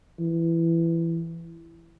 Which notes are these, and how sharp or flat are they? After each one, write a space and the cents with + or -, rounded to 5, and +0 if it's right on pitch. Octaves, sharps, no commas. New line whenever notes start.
E3 +15